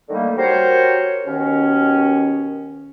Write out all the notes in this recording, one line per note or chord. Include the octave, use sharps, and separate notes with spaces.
D3 D#3 G3 A3 A#3
F#4 G4 A#4 C5 C#5
D#2 B2 D#3 C#4